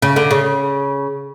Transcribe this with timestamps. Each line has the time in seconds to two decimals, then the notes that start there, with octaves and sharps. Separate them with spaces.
0.02 C#3
0.16 D3
0.31 C#3